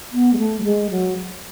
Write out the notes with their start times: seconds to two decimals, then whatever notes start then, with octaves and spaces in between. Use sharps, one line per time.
0.12 B3
0.33 G#3
0.38 A3
0.60 F#3
0.64 G#3
0.90 F#3